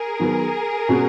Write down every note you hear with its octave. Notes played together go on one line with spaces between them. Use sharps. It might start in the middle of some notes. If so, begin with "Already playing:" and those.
Already playing: G#4 A#4
D#3 F#3 B3
B2 G#3 C#4 F#4